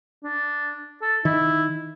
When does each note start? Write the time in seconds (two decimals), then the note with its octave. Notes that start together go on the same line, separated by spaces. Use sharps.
0.24 D4
1.02 A4
1.25 D#3 E4